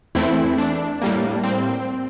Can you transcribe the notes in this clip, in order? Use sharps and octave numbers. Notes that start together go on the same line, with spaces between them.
E2 E3 A3 C4 E4
D4
A2 G3 A#3
C4